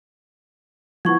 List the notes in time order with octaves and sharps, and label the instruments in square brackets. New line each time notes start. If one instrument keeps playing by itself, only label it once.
[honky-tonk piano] F3 B3 [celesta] E4 C#6 G#6